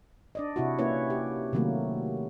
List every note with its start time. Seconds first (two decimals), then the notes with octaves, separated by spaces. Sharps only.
0.35 D4 D5 D#5
0.56 C3 E4 F#4
0.79 A#3 C#4 E4 B4 C#5
1.10 G4
1.53 C3 D#3 F#3 A3 A#3